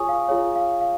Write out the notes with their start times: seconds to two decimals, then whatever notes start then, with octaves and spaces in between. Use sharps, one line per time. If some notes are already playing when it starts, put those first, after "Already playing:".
Already playing: F4 G#4 C#5 G#5 C#6 D#6
0.09 F5
0.28 F4 G#4 C#5 F5
0.55 F5
0.81 F5